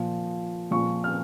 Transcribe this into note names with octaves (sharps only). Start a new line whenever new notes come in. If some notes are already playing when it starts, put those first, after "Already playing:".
Already playing: A#2 F3
A#2 F3 C#6
F6